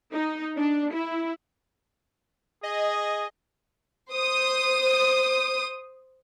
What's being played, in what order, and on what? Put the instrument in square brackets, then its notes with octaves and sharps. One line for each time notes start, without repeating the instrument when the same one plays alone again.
[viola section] D#4
D4
E4
[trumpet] G#4 [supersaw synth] D#5
[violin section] C5 D#6